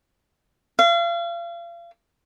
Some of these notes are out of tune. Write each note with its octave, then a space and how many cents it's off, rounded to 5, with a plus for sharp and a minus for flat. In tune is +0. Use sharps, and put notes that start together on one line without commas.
F5 -35